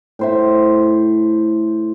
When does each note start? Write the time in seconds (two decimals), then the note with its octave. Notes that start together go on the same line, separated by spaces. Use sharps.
0.19 A2 C5 E5